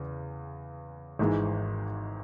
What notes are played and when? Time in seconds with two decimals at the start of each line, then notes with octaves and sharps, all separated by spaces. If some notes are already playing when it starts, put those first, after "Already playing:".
Already playing: E2 C#3
1.19 G#1 G#2 E3 G#3